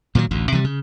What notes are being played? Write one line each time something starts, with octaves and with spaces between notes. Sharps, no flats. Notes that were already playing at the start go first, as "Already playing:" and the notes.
A#2 D#3 F3 F#3
A1 D2
C3 E3 G3
C#3